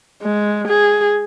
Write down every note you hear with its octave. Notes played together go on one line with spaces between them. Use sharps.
G#3
G#4